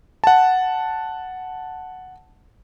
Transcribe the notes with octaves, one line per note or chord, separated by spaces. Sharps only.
F#5 A5